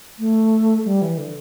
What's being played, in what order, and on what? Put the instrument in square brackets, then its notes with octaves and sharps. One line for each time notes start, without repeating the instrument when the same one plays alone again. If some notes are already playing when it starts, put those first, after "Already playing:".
[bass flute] A3
G3
E3
D3